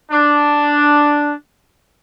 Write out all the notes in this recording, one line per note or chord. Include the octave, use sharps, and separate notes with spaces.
D4